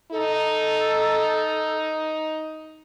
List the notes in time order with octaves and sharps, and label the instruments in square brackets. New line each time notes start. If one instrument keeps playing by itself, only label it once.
[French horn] D#4 [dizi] A4